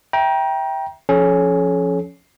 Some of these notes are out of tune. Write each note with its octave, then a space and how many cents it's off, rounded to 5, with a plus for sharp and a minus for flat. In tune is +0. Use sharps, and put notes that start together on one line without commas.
E5 +0 G5 +0 A#5 +30
F3 +0 C#4 +0 A4 -45